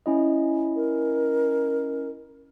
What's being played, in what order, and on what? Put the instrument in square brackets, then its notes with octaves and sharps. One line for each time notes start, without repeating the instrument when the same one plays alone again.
[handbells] C#4 E4 D#5
[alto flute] A#4